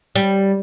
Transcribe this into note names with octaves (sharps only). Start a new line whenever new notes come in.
G3